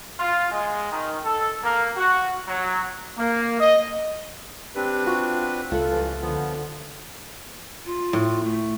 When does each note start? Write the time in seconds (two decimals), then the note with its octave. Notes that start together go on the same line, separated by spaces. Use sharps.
0.20 F4
0.52 G#3
0.92 D#3
1.24 A4
1.64 A#3
1.97 F#4
2.48 F#3
3.18 A#3
3.59 D#5
4.75 C4 D4 G4 B4
5.07 F4 F#4
5.71 C#2 F4 A4 E5 F#5
5.90 G2 E3 F3
6.21 D3 F3 B3
7.85 F4
8.13 A2
8.43 A3